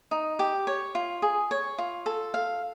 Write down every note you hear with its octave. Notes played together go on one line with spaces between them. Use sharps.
D#4
G4
C#5
F4
G#4
C#5
F4
A4
F5